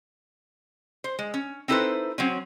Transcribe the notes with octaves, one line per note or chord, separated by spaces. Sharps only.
C5
G#3
C#4
C4 D#4 E4 A4 B4 C5
F#3 C4 C#4